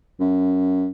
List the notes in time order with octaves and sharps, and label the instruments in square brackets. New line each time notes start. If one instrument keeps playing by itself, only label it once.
[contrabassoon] F#2